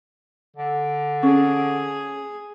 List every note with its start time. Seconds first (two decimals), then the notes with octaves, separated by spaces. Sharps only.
0.56 D3
1.23 C#4 G#4